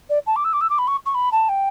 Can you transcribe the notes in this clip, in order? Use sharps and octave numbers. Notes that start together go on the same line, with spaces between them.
D5
A5
D6
E6
D6
E6
D6
B5
C#6
C#6
B5
A5
G5